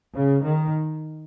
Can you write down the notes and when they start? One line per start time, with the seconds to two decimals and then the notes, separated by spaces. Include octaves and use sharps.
0.15 C#3
0.43 D#3